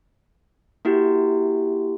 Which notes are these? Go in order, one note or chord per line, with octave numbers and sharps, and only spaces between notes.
A#3 E4 F#4 G4